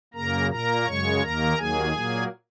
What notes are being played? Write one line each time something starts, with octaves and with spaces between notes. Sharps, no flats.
F#2 C#3 A#3 A#4 A#5
A#2 A#3 A#4 A#5
F#2 C#3 G#3 C#5 C#6
D#2 D#3 A#3 A#4 A#5
D#2 D#3 F#3 A#3 G#4 G#5
A#2 F#3 A#3